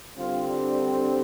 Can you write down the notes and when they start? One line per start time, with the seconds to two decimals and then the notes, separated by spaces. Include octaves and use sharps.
0.17 D3 G3 C4 F4
0.47 D4
0.78 D4